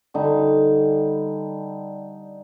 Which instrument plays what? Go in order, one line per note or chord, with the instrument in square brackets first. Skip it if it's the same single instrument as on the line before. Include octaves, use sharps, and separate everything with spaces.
[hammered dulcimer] D3 G3 D#4